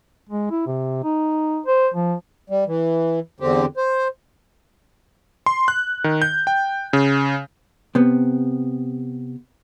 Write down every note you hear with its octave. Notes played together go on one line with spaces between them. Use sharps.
G#3
E4
C3
D#4
C5
F3
G3
E3
E2 D3 C4 G4
C5
C6
F#6
D#3
G6
G5
C#3
C3 B3